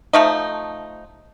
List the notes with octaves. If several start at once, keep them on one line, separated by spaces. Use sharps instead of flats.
F3 A3 D#4